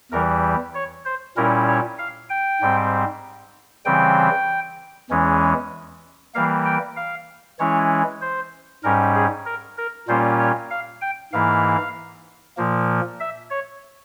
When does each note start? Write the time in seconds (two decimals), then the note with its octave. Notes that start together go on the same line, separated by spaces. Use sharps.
0.11 E2 E3 G3 A#4
0.75 C#5
1.05 C5
1.37 A#2 G3 C#4 E4 A#4
1.68 C#5
1.99 F5
2.30 G5
2.61 G#2 G3 C4
3.85 C#3 E3 G3 C4 G5
5.10 E2 E3 G#3 C#4
6.35 E3 G3 A#3 F5
6.66 G5
6.96 F5
7.59 E3 G#3 C#4 E4 C#5
8.21 C5
8.84 G#2 G3 C#4 A#4
9.15 G#4
9.46 A#4
9.78 A#4
10.08 A#2 G3 A#3 C#4 F4 C5
10.39 C#5
10.71 F5
11.02 G5
11.33 G#2 E3 A#3 E4 F5
12.57 A#2 F3 A#3
13.20 E5
13.50 C#5